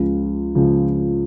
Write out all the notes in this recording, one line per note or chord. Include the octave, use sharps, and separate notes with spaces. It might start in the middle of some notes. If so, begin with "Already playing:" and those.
Already playing: C#2 C#3 F3
C#2 C#3 F3